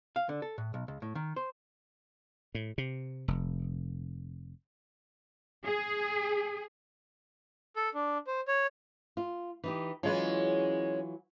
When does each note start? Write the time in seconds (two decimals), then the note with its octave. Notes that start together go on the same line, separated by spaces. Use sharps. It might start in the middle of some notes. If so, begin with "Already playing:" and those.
0.16 F5
0.29 D3
0.42 A4
0.58 A2
0.74 B1
0.88 C#2
1.02 A2
1.15 D#3
1.36 C5
2.55 A2
2.78 C3
3.28 F1
5.65 G#4
7.76 A4
7.94 D4
8.27 C5
8.48 C#5
9.17 F4
9.64 E3 D#4 G4
10.03 E3 F#3 G#3 C#4 F4